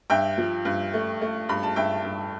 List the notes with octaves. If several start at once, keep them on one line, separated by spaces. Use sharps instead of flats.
G2 E5 G5
F3
G2
A3
A3
G2 B5
A5
G2 E5 G5
G2